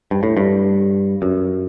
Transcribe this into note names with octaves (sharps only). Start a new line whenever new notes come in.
G2
A2
G2
F#2